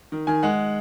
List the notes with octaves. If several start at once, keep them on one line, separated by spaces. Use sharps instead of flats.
D#3
D#3 G#5
G#3 F#5